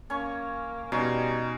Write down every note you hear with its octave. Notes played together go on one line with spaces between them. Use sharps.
A#3 C#4 C#6
B2 G3 C#4 D#4 C6